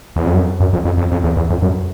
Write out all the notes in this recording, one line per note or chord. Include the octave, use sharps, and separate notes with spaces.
E2
F2
F#2
F#2
F2
F2
F2
F2
E2
E2
F2
F#2